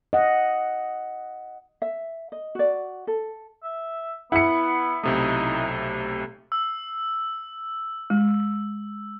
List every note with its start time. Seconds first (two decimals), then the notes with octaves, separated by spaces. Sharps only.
0.13 D#5 F#5
1.82 E5
2.32 D#5
2.55 F#4 D5
3.07 A4
3.63 E5
4.32 B3 E4 F#5 C#7
5.03 B1 C3 A3 D#4
6.52 E6
8.10 G#3